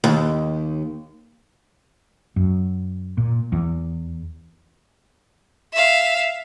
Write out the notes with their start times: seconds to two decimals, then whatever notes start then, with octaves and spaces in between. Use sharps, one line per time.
0.04 D#2
2.36 F#2
3.17 A#2
3.52 E2
5.73 E5 F5